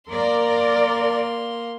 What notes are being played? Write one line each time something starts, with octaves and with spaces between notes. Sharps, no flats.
A#3 A#4 D5 C6